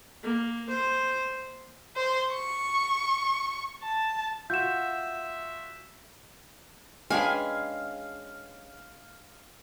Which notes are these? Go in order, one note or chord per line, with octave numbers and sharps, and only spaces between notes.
A#3
C5
C5
C#6
A5
F4 F#4 E5 G6 E7
G#3 C#4 D4 G#4 B4 F5 G5 G#5